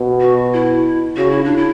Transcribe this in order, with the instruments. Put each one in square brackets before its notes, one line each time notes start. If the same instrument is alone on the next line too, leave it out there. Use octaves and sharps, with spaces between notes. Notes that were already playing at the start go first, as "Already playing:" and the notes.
Already playing: [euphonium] B2
[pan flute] F#4
E4
[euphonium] C#3 [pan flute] F#4
[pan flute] E4
D4
E4